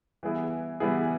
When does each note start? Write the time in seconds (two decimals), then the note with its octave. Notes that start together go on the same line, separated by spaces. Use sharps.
0.23 E3 G3 B3 E4 G#4
0.80 E3 G3 B3 E4 G#4